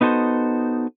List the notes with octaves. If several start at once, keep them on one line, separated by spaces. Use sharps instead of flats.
B3 D#4 F#4 A4 C5